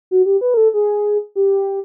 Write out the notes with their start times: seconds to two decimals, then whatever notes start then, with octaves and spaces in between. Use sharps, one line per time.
0.11 F#4
0.26 G4
0.41 B4
0.54 A#4
0.57 A4
0.74 G#4
1.36 G4